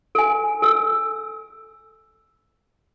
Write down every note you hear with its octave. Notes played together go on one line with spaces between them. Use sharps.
A4 G#5
A4 E6